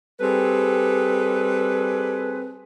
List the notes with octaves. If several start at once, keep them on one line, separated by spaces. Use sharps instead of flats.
G3 C4 G#4 A4 B4